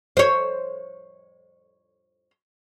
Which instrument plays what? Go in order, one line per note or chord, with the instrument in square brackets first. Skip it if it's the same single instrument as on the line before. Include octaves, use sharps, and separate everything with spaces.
[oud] C5 C#5